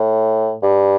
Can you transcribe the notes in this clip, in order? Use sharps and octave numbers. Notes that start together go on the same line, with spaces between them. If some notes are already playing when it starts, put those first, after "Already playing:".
Already playing: A2
G2